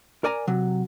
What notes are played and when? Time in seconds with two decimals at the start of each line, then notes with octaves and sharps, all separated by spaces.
0.24 A#4 D5 G#5 A#5
0.47 C3 F#3